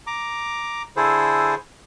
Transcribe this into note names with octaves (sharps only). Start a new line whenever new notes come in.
A#5 D6
D3 E4 G#4 A4 C5